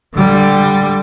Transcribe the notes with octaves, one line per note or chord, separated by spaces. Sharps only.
D3 G3